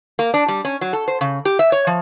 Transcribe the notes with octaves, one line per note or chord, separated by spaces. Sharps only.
A#3
D4
G3
C#4
F#3
A4
C5
C#3
G4
E5
C#5
F3